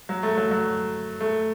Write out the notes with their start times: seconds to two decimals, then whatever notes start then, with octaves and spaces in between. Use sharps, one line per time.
0.09 F#3
0.23 A3
0.37 F#3
0.51 F#3
1.21 A3